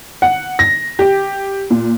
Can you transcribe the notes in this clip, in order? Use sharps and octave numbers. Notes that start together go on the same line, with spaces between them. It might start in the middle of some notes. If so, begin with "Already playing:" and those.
F#5
A#6
G4
A#2